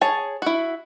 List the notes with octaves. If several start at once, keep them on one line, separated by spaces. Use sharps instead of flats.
G#4 C#5 A5
E4 F#4